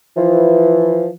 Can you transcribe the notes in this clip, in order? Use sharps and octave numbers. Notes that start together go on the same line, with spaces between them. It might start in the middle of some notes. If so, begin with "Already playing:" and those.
E3 F3